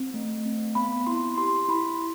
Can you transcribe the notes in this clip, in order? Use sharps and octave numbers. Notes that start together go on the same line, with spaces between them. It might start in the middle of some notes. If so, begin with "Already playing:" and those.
Already playing: C4
A3
C4
B3 B5
E4 C6
G4 C6
E4 B5